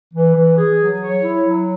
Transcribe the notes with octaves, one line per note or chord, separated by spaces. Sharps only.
E3
E3
G#4
F#3
C#5
E4
F#3